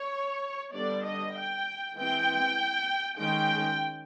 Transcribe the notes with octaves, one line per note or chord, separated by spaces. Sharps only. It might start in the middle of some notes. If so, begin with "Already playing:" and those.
Already playing: C#5
D3 G3 B3 D4 D5
D#5
G5
E3 G#3 C4 G5
D#3 G#3 C#4 G5